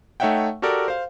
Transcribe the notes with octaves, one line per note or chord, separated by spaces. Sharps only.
A3 D#4 C#5 E5 F#5 G5
F#4 G4 A4 A#4 D5
C5 F5